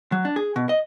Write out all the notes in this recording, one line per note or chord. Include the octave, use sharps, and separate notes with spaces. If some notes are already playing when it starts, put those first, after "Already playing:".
F#3
D4
G#4
B2
D#5